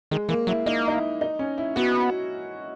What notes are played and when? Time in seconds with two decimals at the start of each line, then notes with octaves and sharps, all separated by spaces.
0.11 D#3 G#3
0.29 E3 A#3
0.47 F#3 E4
0.66 A#3 D#4
0.88 D#4
0.93 E4
1.21 D#4
1.39 C#4
1.58 E4
1.76 B3 F#4